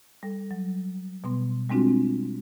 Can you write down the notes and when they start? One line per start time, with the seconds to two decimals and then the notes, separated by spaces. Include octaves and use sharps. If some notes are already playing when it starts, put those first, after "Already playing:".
0.23 G3 A4
0.51 F#3
1.24 B2 G3 B3 C6
1.70 G3 G#3 C4 D4 F4 F#4